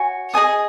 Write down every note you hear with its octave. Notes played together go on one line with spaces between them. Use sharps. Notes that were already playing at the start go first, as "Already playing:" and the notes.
Already playing: F#4 C#5 G#5
G#4 D#5 G#5 D#6